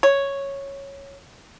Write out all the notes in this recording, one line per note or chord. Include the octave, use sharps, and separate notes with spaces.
C#5